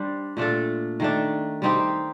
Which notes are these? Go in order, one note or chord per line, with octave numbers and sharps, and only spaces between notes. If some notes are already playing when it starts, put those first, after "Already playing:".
Already playing: G3 D4 C5
A#2 A3 D4 A4
D#3 A3 D4
G3 C4 D#4 G4